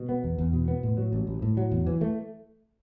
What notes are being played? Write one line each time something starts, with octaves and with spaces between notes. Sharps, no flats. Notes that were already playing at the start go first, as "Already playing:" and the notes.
Already playing: B2
B3
E2
E2
B2
B3
A2
F#3
A1
A1
A2
F#3
E2
E3
A3